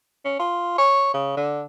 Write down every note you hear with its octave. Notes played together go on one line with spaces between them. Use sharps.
C#4
F4
C#5
C#3
D3